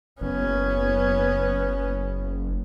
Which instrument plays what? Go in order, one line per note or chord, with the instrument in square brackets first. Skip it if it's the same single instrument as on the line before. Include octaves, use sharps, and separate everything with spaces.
[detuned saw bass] F#1 [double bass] B3 C#4